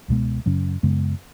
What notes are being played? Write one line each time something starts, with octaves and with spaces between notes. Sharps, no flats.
C#2 B2 G#3 B3
F#2 C#3 F#3 C#4
F#2 C#3 G#3 B3